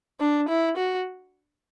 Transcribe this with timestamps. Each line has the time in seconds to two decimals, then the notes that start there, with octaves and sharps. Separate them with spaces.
0.20 D4
0.49 E4
0.77 F#4